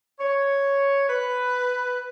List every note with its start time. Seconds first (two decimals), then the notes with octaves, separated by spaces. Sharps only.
0.19 C#5
1.08 B4